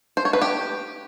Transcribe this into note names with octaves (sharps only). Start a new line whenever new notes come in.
C5
C#5
B4
G4